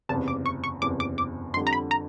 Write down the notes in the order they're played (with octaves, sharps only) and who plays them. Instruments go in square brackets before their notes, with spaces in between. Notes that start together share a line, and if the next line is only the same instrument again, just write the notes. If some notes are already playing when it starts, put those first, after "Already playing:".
[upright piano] F#1 E2 C3 [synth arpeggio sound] A5
[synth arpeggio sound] D6
C#6
C#6
[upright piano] F#1 E2 C3 [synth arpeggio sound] D6
[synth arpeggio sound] D6
D6
[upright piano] F2 [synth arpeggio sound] C6
[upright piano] D3 G3
[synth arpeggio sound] A#5
B5
A#5